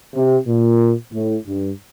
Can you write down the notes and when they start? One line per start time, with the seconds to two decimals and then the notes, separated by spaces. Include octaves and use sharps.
0.14 C3
0.47 A#2
1.13 A2
1.46 G2